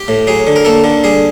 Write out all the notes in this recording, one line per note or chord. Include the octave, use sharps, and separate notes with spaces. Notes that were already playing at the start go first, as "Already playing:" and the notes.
Already playing: G4
A2
F#3 G#4
D3
A#4
A#3 A4
D3
G3 G#4